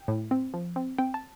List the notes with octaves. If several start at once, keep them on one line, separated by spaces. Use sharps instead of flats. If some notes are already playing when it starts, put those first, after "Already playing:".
Already playing: G5
A2
C4
F3
C4
C4 G5
A5